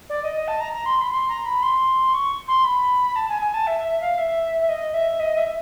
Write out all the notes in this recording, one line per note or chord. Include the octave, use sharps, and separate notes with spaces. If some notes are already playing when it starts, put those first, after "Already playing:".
D5
D#5
D#5
A5
A#5
A#5
C6
B5
C6
A#5
B5
C6
C#6
C6
B5
A5
G#5
G#5
A5
E5
E5
F5
E5
E5
D#5
E5
D#5
E5